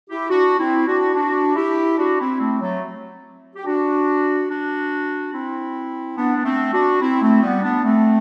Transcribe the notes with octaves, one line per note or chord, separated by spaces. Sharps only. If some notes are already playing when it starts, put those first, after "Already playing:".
E4 G4
D4 F#4
C4 E4
D4 F#4
D4 F#4
E4 G4
D4 F#4
C4 E4
A3 C4
F#3 A3
G4
D4 F#4
D4 F#4
C4 E4
B3 D4
B3
A3 C4
D4 F#4
C4 E4
A3 C4
G3 B3
B3 D4
A3 C4